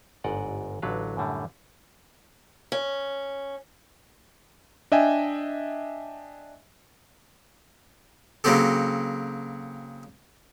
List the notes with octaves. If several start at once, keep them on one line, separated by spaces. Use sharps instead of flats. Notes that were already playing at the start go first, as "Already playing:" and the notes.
G1 G#2 D5 D#5 F#5
A1 D3 F#3 D4 B4 F5
F#2 A2 D3 G3
C#4
D4 D#5 E5 G5 G#5
C#3 F#3 A#3 C4 G4 A4